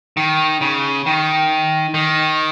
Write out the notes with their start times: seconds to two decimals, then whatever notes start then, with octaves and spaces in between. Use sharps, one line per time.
0.17 D#3
0.61 C#3
1.06 D#3
1.94 D#3